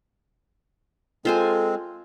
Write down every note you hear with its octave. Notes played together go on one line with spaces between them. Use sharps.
G#3 C4 F4 A4 C5 G#5